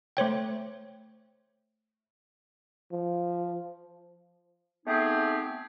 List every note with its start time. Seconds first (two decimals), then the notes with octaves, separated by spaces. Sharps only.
0.17 A3 C5 C#5 G5
2.92 F3
4.86 A3 B3 C4 D#4 G4 G#4